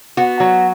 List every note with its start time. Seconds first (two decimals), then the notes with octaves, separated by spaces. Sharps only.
0.17 B3 F#4
0.40 F#3